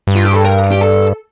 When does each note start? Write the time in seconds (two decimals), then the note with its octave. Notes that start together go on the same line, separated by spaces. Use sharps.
0.07 G2
0.16 F4
0.25 G4
0.34 A4
0.45 A#4
0.71 G4
0.82 A4